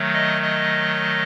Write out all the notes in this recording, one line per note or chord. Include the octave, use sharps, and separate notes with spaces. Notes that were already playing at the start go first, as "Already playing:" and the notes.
Already playing: D#3 F#3 A3
D#5
D#5